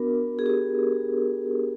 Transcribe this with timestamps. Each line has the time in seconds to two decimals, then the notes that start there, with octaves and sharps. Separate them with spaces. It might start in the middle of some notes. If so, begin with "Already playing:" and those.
Already playing: B3 D4 F#4 A#4
0.39 G#4
0.46 G4